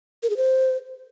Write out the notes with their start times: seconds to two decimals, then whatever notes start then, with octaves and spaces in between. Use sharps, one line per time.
0.23 A#4
0.30 G#4
0.37 C5